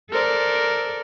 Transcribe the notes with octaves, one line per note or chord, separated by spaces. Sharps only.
A4 A#4 C5 D5